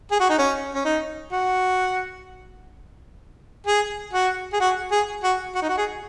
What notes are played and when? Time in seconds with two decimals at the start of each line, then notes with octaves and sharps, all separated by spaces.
0.11 G#4
0.20 F#4
0.29 D#4
0.39 C#4
0.75 C#4
0.85 D#4
1.32 F#4
3.67 G#4
4.13 F#4
4.53 G#4
4.61 F#4
4.92 G#4
5.23 F#4
5.55 F#4
5.62 D#4
5.69 F#4
5.78 G#4